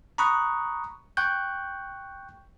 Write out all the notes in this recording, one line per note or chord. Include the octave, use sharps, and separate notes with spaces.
A#5 B5 C#6 D#6 F#6
G5 C#6 F#6 G6